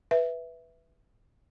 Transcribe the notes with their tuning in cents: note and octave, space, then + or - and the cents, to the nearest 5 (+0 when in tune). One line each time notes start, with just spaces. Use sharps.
B4 +0 E5 +0